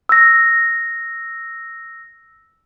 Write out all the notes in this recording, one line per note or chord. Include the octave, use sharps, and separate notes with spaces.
E6 A#6